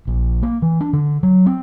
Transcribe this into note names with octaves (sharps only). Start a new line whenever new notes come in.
A#1
A#3
E3
D4
D3
F#3
C4